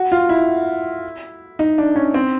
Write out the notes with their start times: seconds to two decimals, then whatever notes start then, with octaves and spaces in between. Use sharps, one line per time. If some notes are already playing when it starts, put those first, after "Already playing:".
Already playing: F#4
0.12 F4
0.29 E4
1.59 D#4
1.78 D4
1.96 C#4
2.14 C4